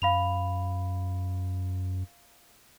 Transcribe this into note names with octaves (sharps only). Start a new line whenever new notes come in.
F#2 F5 B5 F7